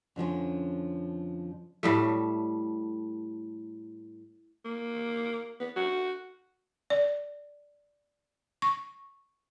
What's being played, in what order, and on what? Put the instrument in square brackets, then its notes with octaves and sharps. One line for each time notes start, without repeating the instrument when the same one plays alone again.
[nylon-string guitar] F2 D3 F3 C#4
[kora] A2 G3 A3
[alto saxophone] A#3
B3
F#4
[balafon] D5
C#6